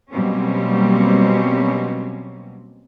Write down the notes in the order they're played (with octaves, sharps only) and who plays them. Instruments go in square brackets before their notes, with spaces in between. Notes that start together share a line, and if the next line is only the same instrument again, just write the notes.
[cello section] B2 F#3 G3 A#3 C4 C#4